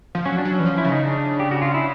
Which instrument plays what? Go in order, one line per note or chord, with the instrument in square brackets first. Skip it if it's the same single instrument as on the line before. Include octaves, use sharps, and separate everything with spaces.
[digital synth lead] F3
[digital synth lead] F#3 [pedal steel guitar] C#4
[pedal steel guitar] D4
[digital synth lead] F#3
[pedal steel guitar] C#4
[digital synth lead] E3
F3
[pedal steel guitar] E4
[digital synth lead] C#3
[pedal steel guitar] D#4
D4
G4
F#4
F4
E4